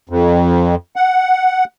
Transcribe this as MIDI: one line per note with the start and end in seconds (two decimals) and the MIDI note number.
0.09 0.75 41
0.96 1.64 78